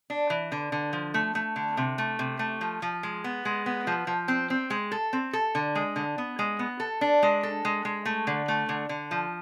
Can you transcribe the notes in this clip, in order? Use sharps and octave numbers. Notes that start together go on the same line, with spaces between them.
D4
E3
D3
D3
F3
A3
A3
D3
C3
A3
C3
A3
F3
F3
G#3
B3
G#3
B3
F3
F3
C4
C4
G#3
A4
C4
A4
D3
G#3
D3
B3
G#3
B3
A4
D4
G#3
A4
G#3
G#3
A3
D3
A3
D3
D3
F3